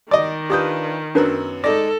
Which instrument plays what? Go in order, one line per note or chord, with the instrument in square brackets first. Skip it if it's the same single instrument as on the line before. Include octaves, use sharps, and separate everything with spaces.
[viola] D#3 [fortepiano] D5 D#5
[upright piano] D4 F4 B4 [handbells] G4 D#6 G6
[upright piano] F#2 F#3 B3 [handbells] D4 A#4 B4
[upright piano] G#3 D#4 A#6 [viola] A4 [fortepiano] D5